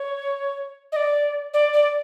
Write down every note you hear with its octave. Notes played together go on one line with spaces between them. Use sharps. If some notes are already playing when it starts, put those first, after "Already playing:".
Already playing: C#5
D#5
D5
D5
D5